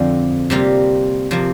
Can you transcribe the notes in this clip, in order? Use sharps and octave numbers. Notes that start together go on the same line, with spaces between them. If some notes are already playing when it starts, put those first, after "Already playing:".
Already playing: F2 D3 F3 C4
C3 G3 A#3 F4
C3 F3 A#3